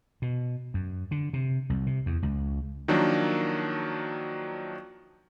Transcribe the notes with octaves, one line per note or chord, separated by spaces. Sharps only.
B2
F#2
D3
C3
C2
C3
E2
C#2
D#3 F3 F#3 A#3 D4